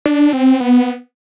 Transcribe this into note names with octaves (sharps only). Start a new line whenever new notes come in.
D4
C4
B3